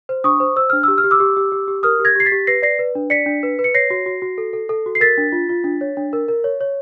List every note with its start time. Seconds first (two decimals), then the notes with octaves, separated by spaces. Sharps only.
0.09 C5
0.24 D4 C#6 D#6
0.40 C5
0.56 C5 E6
0.70 D4 F6
0.83 G4 E6
0.98 F6
1.04 G4
1.11 D6 E6
1.20 G4
1.37 G4
1.52 G4
1.68 G4
1.83 A#4 D#6 F6
2.00 G4
2.05 G#6 A#6
2.16 G4 C7
2.25 A6 B6
2.32 G4
2.47 B4 A#6 C7
2.62 D5 A#6 C7
2.79 B4
2.95 D4
3.10 D5 B6 C#7
3.26 D4
3.43 B4
3.59 B4
3.64 C#7
3.74 C#5 A#6 C7
3.90 F#4
4.06 F#4
4.22 F#4
4.38 A4
4.53 A4
4.69 A4
4.86 F#4
4.95 C7
5.01 A#4 A6 B6
5.18 D4
5.32 F4
5.49 F4
5.64 D4
5.81 C#5
5.97 D4
6.13 A#4
6.28 A#4
6.44 C#5
6.61 C#5